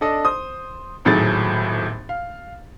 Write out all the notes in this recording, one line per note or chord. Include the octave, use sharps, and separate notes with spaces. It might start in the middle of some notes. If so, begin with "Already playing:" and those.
D4 A4 D5 D#5
C5 D#6
D#1 G#1 A2 F#3 G#4 A6
F5